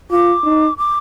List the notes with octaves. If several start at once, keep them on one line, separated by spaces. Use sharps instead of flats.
F4 D6
D#4
D6